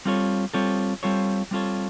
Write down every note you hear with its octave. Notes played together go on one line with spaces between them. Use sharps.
G3 C4 F4 A4 C#5
G3 C4 F4 A4 C#5
G3 C4 F4 A4 C#5
G3 C4 F4 A4 C#5